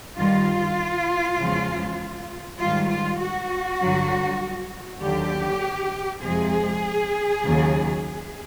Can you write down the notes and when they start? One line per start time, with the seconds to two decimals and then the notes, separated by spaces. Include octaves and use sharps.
0.17 G2 D#3 G3 F4
1.38 E2 C#3 F3 G#3
2.59 G#2 D#3 G3 F4
2.90 F4
3.20 F#4
3.80 G2 D3 F#3
5.02 D#2 D3 F#3 G4
6.23 F2 C3 F3 G#3 G#4
7.44 D#2 C#3 F#3